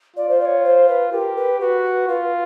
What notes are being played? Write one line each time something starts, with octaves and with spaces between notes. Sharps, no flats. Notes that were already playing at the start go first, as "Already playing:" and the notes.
F4 D5
C5
D5
C#5
C5
B4
G4 A#4
B4
F#4 B4
F4 B4